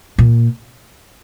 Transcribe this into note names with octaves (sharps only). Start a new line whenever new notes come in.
A#2